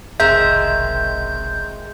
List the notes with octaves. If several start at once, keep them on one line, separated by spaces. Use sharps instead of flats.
F1 B1 D#3 G#3 C4 E5 G6